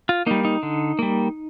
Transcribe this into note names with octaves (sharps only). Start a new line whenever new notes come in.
F4
G3 A#3 D#4
D#4
D3
G3 A#3